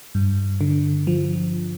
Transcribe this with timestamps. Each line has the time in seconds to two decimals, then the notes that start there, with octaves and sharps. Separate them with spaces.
0.15 G2
0.61 D3
1.07 F3